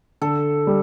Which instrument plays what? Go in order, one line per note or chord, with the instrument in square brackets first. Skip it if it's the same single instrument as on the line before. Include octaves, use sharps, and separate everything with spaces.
[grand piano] D3 [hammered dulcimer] A4
[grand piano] G3